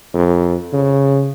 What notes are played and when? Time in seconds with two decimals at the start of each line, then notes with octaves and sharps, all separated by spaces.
0.14 F2
0.73 C#3